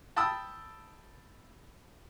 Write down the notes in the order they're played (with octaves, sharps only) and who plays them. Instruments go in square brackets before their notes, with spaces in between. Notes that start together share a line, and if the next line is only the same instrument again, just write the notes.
[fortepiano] G5 A5 B5 D#6 E6